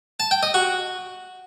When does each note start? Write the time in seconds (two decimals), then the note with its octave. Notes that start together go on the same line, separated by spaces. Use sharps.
0.20 A5
0.31 G5
0.43 D#5
0.54 F#4